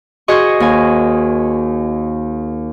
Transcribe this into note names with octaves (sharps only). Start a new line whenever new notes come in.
F#4 G#4 C5 D#5 C#6
D#2 G#5